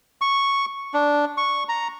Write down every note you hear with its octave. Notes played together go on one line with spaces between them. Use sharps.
C#6
D4
C#6
A#5